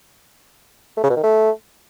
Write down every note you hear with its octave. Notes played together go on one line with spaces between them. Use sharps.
A3
C#3
B2
D#3
A3